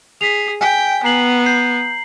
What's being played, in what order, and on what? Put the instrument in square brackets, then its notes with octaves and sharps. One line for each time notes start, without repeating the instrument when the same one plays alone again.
[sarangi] G#4 [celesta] B6 C7 F7
[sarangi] G5 [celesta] G#5 B6
[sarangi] B3 [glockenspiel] A#5 C7 F#7
[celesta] G6 [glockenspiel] C7